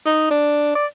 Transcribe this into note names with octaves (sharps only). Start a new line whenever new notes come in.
D#4
D4
D5